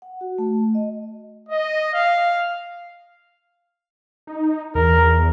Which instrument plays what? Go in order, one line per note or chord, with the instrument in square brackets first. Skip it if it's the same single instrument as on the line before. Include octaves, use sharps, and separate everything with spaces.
[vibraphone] F#5
F#4
A3
D#5
[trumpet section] D#5
F5
[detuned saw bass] D#4
[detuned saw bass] E2 [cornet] A#4